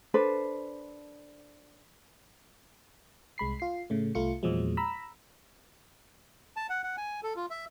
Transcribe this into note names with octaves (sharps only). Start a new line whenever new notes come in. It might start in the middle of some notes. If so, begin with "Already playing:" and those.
D4 A4 B4 C5
C2 G#3 B5 C7
F4 C7
A2 C#3 A3
C2 A3 F4 C#7
E2 A#2 F3 F#3 G#3
A#5 B5 E6
A5
F#5
F#5
G#5
A4
F4
E5